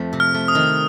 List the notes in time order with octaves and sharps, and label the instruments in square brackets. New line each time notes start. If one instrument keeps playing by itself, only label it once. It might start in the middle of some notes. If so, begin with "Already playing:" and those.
Already playing: [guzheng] F2 F3 A3
C3
[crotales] F6
[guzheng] A3
[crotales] D#6
[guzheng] D#3